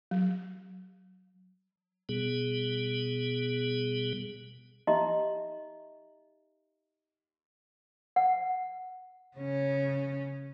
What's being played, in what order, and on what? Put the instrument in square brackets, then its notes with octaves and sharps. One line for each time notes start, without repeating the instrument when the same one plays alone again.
[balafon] F#3
[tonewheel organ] B2 G3 B3 G#4
[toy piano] D#4 G4 D#5 E5 A#5 C6
F#5
[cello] C#3 C#4